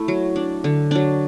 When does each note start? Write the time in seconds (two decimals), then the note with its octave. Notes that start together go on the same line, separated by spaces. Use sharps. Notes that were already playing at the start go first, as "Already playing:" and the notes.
Already playing: A3 E4
0.08 F#3
0.36 D4
0.64 D3
0.91 F#3 D4